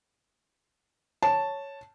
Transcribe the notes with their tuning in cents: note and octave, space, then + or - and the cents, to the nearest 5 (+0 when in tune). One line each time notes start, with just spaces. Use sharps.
C#5 +0 A5 +0